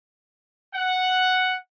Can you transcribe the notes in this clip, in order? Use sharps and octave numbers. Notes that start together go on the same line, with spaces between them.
F#5